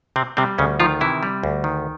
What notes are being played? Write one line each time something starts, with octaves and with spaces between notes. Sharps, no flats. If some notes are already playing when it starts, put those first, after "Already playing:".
C3 C4
C3 G3 C4
D2 C#3 C#4
D#3 F3 F4
C3 E3 E4
G3
D2
D#3